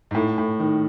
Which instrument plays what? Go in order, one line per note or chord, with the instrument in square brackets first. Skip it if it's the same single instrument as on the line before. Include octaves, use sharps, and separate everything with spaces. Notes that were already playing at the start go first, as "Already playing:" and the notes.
[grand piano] G#2
A2
A2
D#3